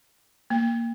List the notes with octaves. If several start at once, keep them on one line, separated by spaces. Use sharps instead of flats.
A#3